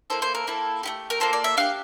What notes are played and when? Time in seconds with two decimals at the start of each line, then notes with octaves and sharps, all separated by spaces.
0.10 A#3 E4 A4 C5
0.22 C5
0.35 A#4
0.47 A#3 E4 A4
0.83 A3 E4 G4
1.10 A#4
1.20 A#3 F4 A4 C5
1.33 D5
1.44 E5
1.57 D4 G4 F5